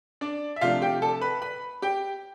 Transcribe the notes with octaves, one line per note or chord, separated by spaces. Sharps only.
D4 D5
E5
C3 F3 A3 D4 F4 F5
G4 G5
A4 A5
B4 B5
B4 B5
G4 G5